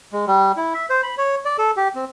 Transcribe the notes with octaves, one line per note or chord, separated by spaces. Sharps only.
G#3
G3
E4
E5
C5
B5
C#5
D5
A4
G4
C4